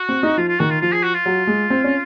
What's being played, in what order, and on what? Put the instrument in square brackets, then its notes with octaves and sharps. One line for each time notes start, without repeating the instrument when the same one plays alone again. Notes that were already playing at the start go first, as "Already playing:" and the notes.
Already playing: [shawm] F#4
[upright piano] C4
D#4
[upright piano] F3 [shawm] F4
[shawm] F4
[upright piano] D#3 [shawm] F#4
[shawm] F4
[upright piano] F3 [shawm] F4
[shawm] G#4
F#4
F4
[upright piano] F#3
G#3
C4
C#4